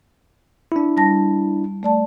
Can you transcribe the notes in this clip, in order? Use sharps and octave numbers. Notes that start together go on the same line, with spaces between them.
D4 E4
G3 A5 A#6
A3 D5 A5